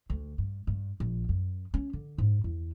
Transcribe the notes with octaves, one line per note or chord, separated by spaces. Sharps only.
D2
G2
G2
A#1
F#2
C#4
D3
G#2
E2